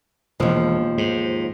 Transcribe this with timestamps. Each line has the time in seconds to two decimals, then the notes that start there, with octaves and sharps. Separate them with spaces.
0.40 E1 D#2 F3
0.98 G#2